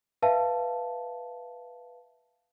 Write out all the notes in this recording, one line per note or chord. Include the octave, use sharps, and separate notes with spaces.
B4 E5 F5 A5